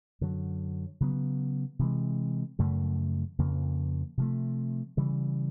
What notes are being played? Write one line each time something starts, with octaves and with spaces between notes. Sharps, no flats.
F#2 D3 F#3
C#3 F#3 B3
C3 E3 G#3
F#2 C#3 F3 A3
F2 C#3 F3 A#3
C3 F3 A3
C#3 E3 G3